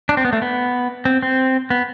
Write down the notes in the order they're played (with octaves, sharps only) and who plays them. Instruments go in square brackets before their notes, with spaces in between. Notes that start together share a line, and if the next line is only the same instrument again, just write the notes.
[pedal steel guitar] D4
C4
B3
A3
B3
C4
C4
B3